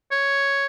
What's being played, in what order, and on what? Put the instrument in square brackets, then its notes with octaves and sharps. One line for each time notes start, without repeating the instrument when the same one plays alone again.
[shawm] C#5